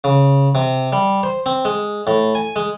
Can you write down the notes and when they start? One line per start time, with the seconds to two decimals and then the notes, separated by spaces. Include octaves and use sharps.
0.04 C#3
0.55 C3
0.92 G3
1.23 C5
1.46 C4
1.65 G#3
2.07 A2
2.35 G#5
2.56 G#3